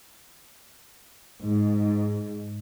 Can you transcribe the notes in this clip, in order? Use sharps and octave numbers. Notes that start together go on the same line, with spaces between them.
G#2